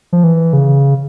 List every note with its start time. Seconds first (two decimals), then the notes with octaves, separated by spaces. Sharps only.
0.13 F3
0.24 E3
0.53 C#3